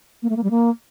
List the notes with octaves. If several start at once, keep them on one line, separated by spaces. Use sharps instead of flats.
A#3
A3
A#3
G3
A#3